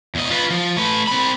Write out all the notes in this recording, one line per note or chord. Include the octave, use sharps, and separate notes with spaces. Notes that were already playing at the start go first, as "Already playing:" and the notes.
E2 D#5
F4 B4
F3
A3 B4
C4 B5